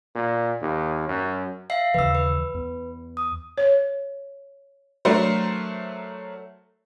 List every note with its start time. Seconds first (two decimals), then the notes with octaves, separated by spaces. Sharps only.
0.15 A#2
0.61 D#2
1.08 F#2
1.70 E5 F5 C7
1.94 D#2 C#3 E3 B4 E6
2.15 B4
2.54 E2
3.17 D#6
3.58 C#5
5.05 F#3 A3 D4 A#4 C5